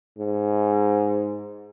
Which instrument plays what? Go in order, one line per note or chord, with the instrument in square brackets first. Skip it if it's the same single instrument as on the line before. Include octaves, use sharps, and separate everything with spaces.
[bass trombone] G#2